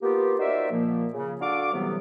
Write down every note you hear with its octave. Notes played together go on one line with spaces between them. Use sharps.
A#3 B3 F4 G4
D#4 F#4 A#4 C5 D5 E5
A#2 F3 A#3
C#3
D4 F#4 A4 F5 D6
A2 C3 E3 F#3 G3 B3